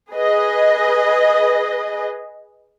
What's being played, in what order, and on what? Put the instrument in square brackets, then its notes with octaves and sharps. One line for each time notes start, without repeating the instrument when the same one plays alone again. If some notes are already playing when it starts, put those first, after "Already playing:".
[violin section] G#4 B4 D#5